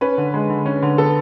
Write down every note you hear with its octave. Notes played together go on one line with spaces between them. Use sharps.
C#4 B4
D3
G#3
D3
C#4
D3
B3 A4